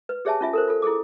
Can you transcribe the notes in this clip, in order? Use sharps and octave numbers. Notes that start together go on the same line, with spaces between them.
B4
G4 G#4 C#5 E5 G#5 A5
C#4 F4 E5 G#5
A4 A#4 C5
F4 A4
E4 G#4 A4 D6